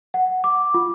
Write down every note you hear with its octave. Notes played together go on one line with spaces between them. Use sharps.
F#5
D6
F4